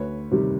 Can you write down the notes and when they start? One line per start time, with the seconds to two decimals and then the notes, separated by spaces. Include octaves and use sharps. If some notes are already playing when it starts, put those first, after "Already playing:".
Already playing: D2 B4 C#5
0.31 C3 D#3 G3